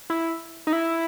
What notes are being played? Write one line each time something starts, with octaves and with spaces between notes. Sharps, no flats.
E4
D#4
E4